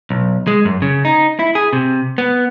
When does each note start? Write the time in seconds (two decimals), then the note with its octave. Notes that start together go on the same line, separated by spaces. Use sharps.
0.10 B1
0.47 G#3
0.65 F#2
0.82 C#3
1.05 D#4
1.39 E4
1.55 G#4
1.73 C3
2.18 B3